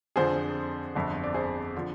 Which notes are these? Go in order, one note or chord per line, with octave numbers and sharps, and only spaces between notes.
F2 D3 F3 G#4 C5
G1 F2 D3
D5
G#4 C5
D3 F3